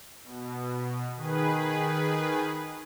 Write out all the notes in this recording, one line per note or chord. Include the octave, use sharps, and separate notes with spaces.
B2
D#3 G#4 B4